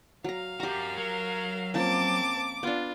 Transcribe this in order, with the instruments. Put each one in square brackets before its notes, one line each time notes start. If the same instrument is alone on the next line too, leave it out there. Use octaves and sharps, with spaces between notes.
[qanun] F#3 A#5 [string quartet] F5
[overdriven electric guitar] F#4 A#4 [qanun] G4 A#5
[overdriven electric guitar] F#3 [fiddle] A#4
[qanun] F3 A#3 C#4 [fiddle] C4 A5 [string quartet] D6
[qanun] B3 D4 [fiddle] F4